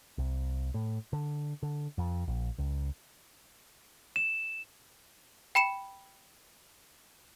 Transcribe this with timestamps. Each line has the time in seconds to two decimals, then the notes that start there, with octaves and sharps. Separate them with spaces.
0.18 C2
0.74 A2
1.13 D3
1.63 D3
1.98 F2
2.28 A#1
2.58 C#2
4.16 E7
5.55 G5 B5 C#7 E7